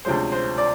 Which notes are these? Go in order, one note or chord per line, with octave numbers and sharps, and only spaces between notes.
D2 C3 F3 G#3 C#4 C5
C5
D5